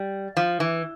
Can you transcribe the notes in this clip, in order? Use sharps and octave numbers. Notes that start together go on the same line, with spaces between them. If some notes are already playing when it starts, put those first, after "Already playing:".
Already playing: G3
F3
E3